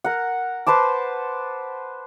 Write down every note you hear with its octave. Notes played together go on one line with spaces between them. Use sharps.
A#4 F#5
B4 C5 A5 D6